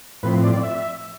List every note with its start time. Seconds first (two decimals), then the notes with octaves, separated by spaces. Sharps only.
0.23 A2 F3 C4 B4
0.43 D5
0.53 D5
0.63 E5